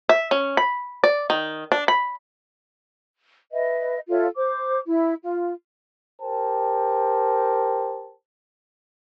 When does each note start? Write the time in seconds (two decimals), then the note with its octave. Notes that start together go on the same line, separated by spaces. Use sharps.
0.09 E5
0.31 C#4
0.57 B5
1.04 D5
1.30 D#3
1.72 D4
1.88 B5
3.52 B4 D#5 E5
4.09 F4 A4 C#5 E5
4.36 C5 D6
4.86 E4
5.23 F4
6.21 G4 A#4 C5 G5 A5